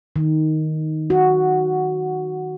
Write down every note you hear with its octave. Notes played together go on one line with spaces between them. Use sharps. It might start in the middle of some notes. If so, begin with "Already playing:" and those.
D#3
F#4